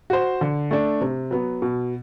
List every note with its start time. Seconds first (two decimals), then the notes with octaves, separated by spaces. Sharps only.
0.10 F#4 C5
0.41 D3
0.71 A3 D4
1.01 C3
1.31 F#3 B3
1.62 B2